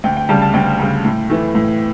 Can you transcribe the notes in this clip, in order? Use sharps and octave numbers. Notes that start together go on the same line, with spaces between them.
D2 G5
G5
C#3 G3 A5
A5
D2 G5
C#3 G3
A2
E3 A3
A2